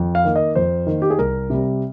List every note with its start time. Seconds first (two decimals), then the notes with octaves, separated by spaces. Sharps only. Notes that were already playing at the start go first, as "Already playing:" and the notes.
Already playing: F2
0.15 F5
0.24 D#3 A#3
0.36 D#5
0.55 F2 C5
0.87 D#3 A#3
1.02 G4
1.10 G#4
1.19 C2 A#4
1.50 C3 G3